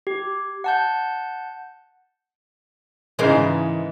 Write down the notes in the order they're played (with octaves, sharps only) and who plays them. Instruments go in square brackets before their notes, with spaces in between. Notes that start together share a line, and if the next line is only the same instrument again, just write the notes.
[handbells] G4
F#5 A5 G6
[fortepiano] G#2 C#3 G#3 [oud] E3 A#4 C5